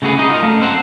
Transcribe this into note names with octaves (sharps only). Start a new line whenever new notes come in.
C#3 A3 F#4 G#4 B4
D#4 F#4 D#5
F4 A#4
F#2 A3 F5
C4 C5 F#5